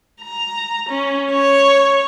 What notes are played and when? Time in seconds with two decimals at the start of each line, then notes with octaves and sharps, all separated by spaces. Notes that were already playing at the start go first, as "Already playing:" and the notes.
0.21 A#5
0.89 C#4
1.31 C#5